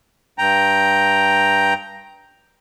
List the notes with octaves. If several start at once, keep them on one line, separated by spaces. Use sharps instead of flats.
G2 G5 A#5